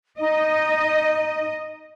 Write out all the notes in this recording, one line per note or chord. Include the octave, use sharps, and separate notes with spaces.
D#4 D#5